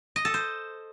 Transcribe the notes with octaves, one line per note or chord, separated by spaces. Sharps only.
D#5
A4
C5